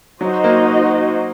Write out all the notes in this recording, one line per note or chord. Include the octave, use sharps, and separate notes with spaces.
F#3 D#4 F#4 C5 D#5
A#3